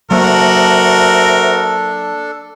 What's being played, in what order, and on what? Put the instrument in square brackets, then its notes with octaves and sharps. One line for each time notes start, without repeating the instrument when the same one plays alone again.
[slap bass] F#3 A#3 [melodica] D4 A4 [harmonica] F#4 A#4 [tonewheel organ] C5 E5